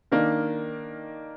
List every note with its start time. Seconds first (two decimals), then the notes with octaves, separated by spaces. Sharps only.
0.12 D#3 A#3 D4